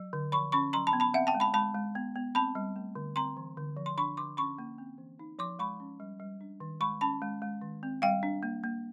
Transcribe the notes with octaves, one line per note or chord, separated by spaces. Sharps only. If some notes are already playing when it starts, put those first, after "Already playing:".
Already playing: F#3
D3
F3 B5 C#6
C#4 B5 C#6
F#3 A#5 C6
A5 B5
B3
A5 B5
C4 E5 F#5
G5 A5
G#3
A5 B5
G#3 A5 B5
G#3
B3
B3
C4 A5 B5
G3
A3
D3
C4 A#5 C6
E3
D3
F3
C6
D4 B5 C#6
D3 C6 D6
C#4 B5 C#6
A#3
C4
E3
D#4
F3 C6 D6
G#3 B5 C#6
C#4
G3
G3
D4
D#3
G#3 B5 C#6
C#4 A5 B5
G#3
G#3
D#3
C4
G3 F5 G5
D4
A#3
A#3